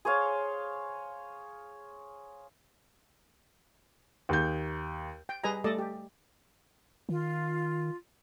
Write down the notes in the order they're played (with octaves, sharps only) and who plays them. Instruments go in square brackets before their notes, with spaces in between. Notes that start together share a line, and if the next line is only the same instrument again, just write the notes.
[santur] G#4 C5 C#5 F5
[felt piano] D#2 G6
[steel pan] G5
G3 G#4 B4 D#5 G#5 A#5
G3 A3 A4 D5 D#5 A5
G4
[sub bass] D#3 [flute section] F4